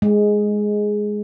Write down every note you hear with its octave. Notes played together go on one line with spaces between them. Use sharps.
G#3